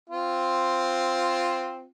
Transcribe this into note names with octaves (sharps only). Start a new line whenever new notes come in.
C4 F4